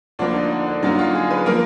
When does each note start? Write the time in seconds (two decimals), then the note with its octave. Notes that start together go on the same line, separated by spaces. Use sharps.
0.19 D2 D3 F3 A#3 D4
0.34 D#4
0.51 D4
0.66 D4
0.83 F#2 D3 F#3 A#3 D#4
0.99 F4
1.15 G#4
1.30 B4
1.46 F3 A#3 A#4